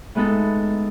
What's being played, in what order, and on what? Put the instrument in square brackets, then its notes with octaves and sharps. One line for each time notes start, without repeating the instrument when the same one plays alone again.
[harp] A2 G#3 B3 D#4 A4